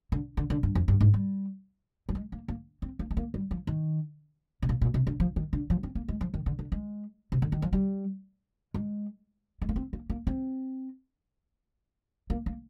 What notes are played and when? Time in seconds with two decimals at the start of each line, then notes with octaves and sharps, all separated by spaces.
0.12 D3
0.37 D3
0.50 D3
0.63 G2
0.75 F2
0.88 G2
1.01 G#2
1.14 G3
2.09 G3
2.15 G#3
2.32 A#3
2.48 A#3
2.82 C4
2.99 A#3
3.11 G#3
3.17 A#3
3.34 G3
3.51 F3
3.67 D#3
4.62 C3
4.69 A#2
4.81 A#2
4.94 C3
5.07 D3
5.20 F3
5.36 D#3
5.53 D3
5.70 F3
5.83 C4
5.95 A#3
6.08 G#3
6.21 F3
6.34 D#3
6.46 D3
6.59 D3
6.72 G#3
7.32 C3
7.42 D3
7.52 D#3
7.62 F3
7.73 G3
8.74 G#3
9.62 G#3
9.69 A#3
9.76 C4
9.93 A#3
10.10 A#3
10.27 C4
12.30 A#3
12.46 A#3